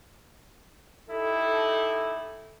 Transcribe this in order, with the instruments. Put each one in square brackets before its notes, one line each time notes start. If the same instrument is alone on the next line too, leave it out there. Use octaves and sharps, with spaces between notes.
[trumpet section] D#4 E4 G4 [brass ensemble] A4